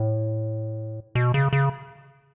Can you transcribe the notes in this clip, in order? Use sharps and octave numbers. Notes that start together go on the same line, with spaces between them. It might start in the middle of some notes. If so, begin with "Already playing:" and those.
Already playing: A2
B2
C#3
C#3